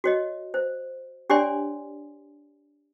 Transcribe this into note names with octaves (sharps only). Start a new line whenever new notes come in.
F#4 C#5 D#5
C5
D4 G4 C#5 D5 G#5 C6